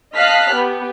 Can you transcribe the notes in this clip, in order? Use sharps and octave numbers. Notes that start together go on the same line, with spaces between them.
D#5 F5 A5 F6 F#6 B6
B3 G4